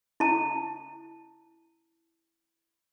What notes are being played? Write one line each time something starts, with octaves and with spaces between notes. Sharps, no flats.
E4 A5